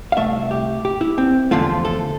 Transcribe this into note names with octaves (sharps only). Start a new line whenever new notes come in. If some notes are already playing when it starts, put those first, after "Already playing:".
F5
C2 B2 A3 E5
G4
G4
E4
C4
E2 D3 F3 A3 F4
A4